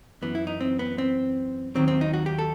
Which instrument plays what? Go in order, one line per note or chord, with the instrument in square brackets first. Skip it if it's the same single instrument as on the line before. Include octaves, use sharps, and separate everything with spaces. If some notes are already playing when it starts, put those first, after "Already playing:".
[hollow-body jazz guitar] F#2 E3 B3
E4
D#4
C4
B3
C4
D#2 D#3 F#3 C4
C4
D#4
F#4
G4
A4